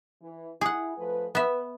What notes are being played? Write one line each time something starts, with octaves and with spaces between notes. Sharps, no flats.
E3
E4 G#4 F#5
F3 A3 B4
B3 B4 E5